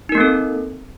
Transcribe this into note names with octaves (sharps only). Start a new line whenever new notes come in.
A#3 C4 D#4 A4 A#4